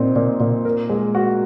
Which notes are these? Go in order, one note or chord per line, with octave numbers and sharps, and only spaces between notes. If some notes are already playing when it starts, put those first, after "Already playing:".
Already playing: A#2 C4 D#4
A#2
A#2
A#4
G#3
F#4